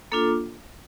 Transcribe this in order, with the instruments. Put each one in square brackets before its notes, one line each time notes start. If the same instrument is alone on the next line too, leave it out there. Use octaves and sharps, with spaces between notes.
[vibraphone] A#3 D4 F4 A4